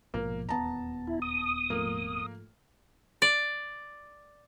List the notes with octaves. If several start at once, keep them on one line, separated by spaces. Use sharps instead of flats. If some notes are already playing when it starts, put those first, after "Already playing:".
A#1 G#2 B2 F3 A#3
D#1 E2 B3 A5 A#5
E4
D#6
G#2 F3 A3 A#3
D5